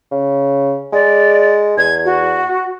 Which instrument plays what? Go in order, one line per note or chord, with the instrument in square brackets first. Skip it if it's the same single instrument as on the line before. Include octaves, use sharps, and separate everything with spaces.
[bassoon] C#3
[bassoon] G#3 [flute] D5
[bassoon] E2 [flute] G#6
[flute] F#4